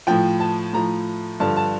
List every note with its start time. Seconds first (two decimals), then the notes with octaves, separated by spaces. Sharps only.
0.07 A2 F3 G5
0.40 A5
0.73 A2 F3 A#5
1.40 G2 D3 F3 A5
1.57 A5